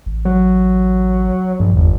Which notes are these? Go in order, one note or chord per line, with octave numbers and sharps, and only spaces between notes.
A1
F#3
A#1 G2
G1 E2